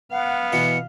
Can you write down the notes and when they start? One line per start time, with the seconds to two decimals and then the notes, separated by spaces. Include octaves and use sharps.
0.11 B3 F5 F#5
0.53 B2 E3 C#7